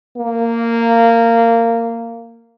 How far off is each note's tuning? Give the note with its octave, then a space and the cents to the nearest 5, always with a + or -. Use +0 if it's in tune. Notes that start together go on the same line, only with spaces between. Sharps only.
A#3 -15